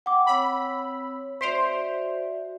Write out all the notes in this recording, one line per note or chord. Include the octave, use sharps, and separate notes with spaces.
F#5 G5 D6
C4 C#5 B5 E6
F#4 C5 D5 E5 B6 D7 F7